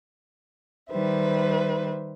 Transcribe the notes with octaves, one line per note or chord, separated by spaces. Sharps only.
D#3 G3 B4 C5 E5